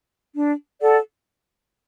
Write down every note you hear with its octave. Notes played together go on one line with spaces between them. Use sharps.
D4
A4 D5 F#5